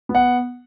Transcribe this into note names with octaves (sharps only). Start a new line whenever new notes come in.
B3
F#5